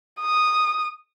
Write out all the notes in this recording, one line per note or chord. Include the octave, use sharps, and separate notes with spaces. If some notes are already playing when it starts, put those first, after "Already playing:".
D#6